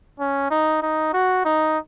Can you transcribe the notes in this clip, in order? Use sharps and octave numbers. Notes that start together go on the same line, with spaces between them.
C#4
D#4
D#4
F#4
D#4